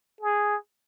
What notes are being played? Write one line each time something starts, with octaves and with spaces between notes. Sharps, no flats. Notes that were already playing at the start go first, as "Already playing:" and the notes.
G#4